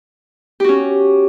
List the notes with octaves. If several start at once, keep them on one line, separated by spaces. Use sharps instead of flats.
C#4 F#4 G4